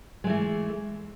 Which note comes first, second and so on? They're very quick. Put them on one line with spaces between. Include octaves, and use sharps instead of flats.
G#3 A3 E3